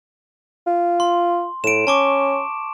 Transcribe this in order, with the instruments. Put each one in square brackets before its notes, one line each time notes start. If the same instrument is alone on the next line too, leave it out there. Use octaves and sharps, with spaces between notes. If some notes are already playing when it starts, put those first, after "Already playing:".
[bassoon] F4
[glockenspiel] C6
[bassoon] A2 [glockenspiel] D7 E7
[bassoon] C#4 [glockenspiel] A5 C#6 D6